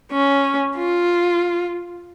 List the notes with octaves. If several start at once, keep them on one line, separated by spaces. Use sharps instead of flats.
C#4
F4